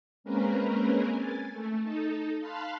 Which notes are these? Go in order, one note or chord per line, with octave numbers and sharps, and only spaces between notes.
G#3 A#3 C4 C#4 A#4 B4
G#5 A6
A3
D#4 A4
F5 A5 B5 C6 F6 F#6